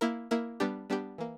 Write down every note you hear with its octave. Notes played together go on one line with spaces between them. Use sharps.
A#3 E4 A#4
A#3 E4 A#4
G3 B3 D4 G4
G3 B3 D4 G4
E3 A#3